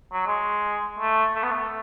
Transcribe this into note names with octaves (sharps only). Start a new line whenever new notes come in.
F#3
G#3
A3
A3
B3
A3